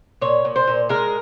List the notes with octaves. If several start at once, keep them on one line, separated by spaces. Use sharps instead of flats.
A#2 C#5
A#2
C5
A#2
G#3 A#4